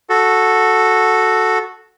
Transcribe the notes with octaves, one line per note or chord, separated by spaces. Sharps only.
F#4 A4